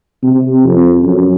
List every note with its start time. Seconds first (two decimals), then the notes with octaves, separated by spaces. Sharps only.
0.23 C3
0.65 F2
1.03 F#2